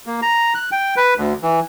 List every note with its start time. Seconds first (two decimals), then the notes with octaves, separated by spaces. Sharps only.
0.06 A#3
0.22 A#5
0.55 F#6
0.72 G5
0.97 B4
1.17 D2
1.43 E3